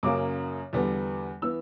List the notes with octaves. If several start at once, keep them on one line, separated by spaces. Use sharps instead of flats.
F#2 C#3 F#3 A#3 D6
E2 D3 G3 B3
E3 B3 E6